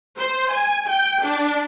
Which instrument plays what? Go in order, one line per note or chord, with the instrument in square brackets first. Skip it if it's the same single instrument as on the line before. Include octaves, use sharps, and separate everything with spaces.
[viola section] C5
G#5
G5
D4